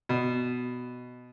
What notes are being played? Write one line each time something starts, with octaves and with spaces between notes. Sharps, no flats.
B2